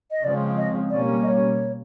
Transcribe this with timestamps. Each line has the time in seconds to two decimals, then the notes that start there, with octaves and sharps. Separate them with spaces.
0.11 D#5
0.24 C#3 F3 G#3 C4 D5
0.57 D#5
0.90 B2 G3 A#3 C#4 D5
1.23 D#5
1.28 C#5